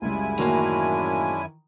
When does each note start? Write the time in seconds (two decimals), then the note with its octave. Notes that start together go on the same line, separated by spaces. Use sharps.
0.02 C#2 F#2 G3 G#3 E4 F4 G#5
0.38 A2 D#3 E3 G#3 A#3 C#4 D4 F#4